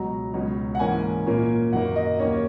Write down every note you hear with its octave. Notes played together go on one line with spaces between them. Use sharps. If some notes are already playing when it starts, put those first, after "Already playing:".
Already playing: C#2 B2 F#3 A#5
C#2 B2 F#3 C#4
F#5
G#2 E3 A#3 C#4 G#5
A#2 A#3 C#4
F#2 D#3 A#3 F#5
D#5
D#2 D#3 A#3 C#4 C#5